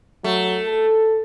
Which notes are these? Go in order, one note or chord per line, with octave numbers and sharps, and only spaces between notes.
F#3 A3
A4